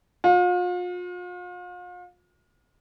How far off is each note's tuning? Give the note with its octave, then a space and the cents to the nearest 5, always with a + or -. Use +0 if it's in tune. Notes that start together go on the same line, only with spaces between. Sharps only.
F4 +40